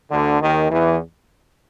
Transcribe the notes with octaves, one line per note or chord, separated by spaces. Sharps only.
D2 D3
D#2 D#3
E2 E3